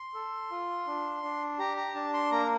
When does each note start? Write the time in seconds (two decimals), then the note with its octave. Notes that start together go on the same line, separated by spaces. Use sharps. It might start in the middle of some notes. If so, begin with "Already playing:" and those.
Already playing: C6
0.14 A4
0.51 F4
0.87 D4
1.23 D4
1.59 G4 A#5
1.77 A#5
1.95 D4 A5
2.14 C6
2.31 A#3 A#5